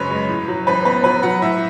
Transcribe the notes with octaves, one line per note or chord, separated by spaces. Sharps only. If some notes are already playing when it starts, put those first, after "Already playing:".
Already playing: F#2 C#3 G#3 B4 C#5
G#3
A2
F#3
A1 B4
B3 B4
F#3 B4
F#3 F#5
A2 E5